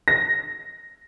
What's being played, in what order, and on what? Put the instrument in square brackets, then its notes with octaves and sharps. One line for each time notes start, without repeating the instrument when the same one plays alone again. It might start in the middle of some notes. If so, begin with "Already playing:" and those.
[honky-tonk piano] A#6